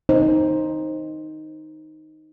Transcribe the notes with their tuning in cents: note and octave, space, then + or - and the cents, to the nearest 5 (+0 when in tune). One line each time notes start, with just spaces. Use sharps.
D#4 +0 C5 +15